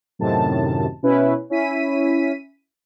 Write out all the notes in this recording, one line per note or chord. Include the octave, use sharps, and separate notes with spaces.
F#2 A2 C3 D#3 A5
B2 C#4 E4 B4
C#4 E4 B6 D#7